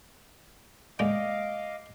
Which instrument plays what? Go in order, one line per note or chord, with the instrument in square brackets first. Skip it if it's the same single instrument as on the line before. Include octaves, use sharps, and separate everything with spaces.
[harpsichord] D3 G#3 A#3 [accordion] D#5 F5 D6